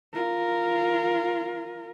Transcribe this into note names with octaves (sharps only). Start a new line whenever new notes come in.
F4 A#4